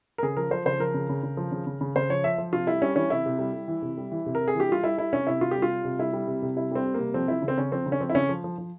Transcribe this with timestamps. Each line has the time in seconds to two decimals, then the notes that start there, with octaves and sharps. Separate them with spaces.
0.18 A#4
0.23 C#3 G#4
0.37 F3 A#4
0.51 F3 C5
0.65 C#3 C5
0.80 F3 A#4
0.94 C#3
1.09 C#3
1.23 C#3
1.37 F3
1.52 C#3
1.67 C#3
1.81 C#3
1.96 C#3 C5
2.10 F3 C#5
2.24 F3 E5
2.38 F3
2.53 C3 F4
2.67 G3 E4
2.82 G3 C#4
2.96 E3 C#4
3.10 C3 E4
3.26 C3
3.39 G3
3.54 G3
3.68 E3
3.82 C3
3.97 G3
4.12 E3
4.26 C3
4.35 A#4
4.40 C3
4.48 G#4
4.55 E3
4.60 G4
4.69 G3 F4
4.84 G3 E4
4.98 G3 E4
5.12 C3 C#4
5.27 C3 E4
5.41 C3 F4
5.51 G3 G4
5.62 F4
5.70 G3
5.84 C3
5.99 G3 E4
6.13 G3
6.28 C3
6.42 C3
6.56 G3 E4
6.71 G3 C4
6.86 G3
6.94 A#3
6.99 C3
7.14 F3 C4
7.28 F3 E4
7.42 C#3
7.48 C4
7.57 C#3 C#4
7.72 F3 C4
7.86 C#3
7.92 C#4
8.00 F3 C4
8.10 E4
8.15 C#3 C#4
8.29 F3
8.44 F3
8.58 F3